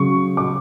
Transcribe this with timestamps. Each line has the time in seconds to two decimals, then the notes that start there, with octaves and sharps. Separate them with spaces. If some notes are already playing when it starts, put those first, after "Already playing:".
Already playing: C#3 F#3 C#6
0.37 D6